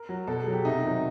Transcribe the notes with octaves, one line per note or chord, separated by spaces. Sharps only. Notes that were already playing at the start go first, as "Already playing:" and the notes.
Already playing: A#4
F#3
B2 A4
G#4
F#3
G4
C3 D#4
D#3 F#3